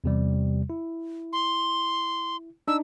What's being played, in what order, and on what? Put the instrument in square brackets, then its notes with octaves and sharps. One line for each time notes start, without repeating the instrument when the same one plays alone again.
[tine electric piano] E2 C3 G3
E4
[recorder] C6
[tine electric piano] D4 D#4 [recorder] E6